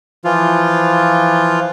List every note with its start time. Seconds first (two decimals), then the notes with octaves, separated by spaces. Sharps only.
0.24 E3 F3 F4